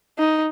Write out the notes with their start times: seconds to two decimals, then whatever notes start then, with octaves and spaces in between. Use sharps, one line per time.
0.19 D#4